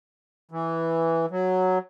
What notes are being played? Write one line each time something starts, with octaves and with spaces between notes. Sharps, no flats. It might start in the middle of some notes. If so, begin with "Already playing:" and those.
E3
F#3